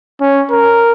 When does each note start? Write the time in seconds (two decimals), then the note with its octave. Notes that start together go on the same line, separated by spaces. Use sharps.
0.21 C#4
0.51 A#4